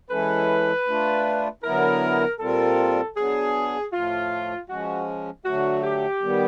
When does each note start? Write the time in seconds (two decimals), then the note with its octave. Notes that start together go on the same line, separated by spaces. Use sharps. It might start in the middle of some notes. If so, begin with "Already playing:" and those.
0.11 E3 G#3 C#4 E4 A4 B4
0.87 A3 D4 F4
1.63 D3 F#3 B3 E4 A#4
2.40 A#2 G3 C4 F4 A4 A#4
3.16 F#3 B3 D4 G#4
3.93 A2 F3 A3 F4
4.69 F3 G#3 C#4 F#4
5.45 D3 F#3 A3 F#4
5.83 G4
6.22 D#3 G3 B3